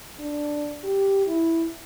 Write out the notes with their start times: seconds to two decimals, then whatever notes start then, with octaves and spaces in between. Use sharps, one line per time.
0.19 D4
0.84 G4
1.27 E4